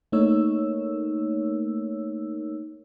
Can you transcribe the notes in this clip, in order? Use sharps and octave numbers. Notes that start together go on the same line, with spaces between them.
A3 A#3 D#4 A#4 C#5 E6